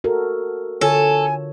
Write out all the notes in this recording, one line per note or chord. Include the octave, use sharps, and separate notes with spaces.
F#4 A4 A#4
D3 F4 A4 C#5 G#5